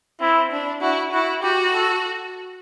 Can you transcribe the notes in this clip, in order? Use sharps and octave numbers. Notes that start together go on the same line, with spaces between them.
C4 E4
D4
E4 F#4
E4 F#4
F#4 G4
A4